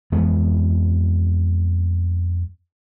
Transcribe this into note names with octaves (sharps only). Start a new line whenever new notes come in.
F2 E3 G#3 B3